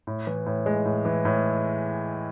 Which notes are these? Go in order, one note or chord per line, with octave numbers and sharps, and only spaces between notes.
A2
E3
A2
G#3
A2
E3
A2